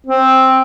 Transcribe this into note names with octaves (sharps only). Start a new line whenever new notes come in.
C4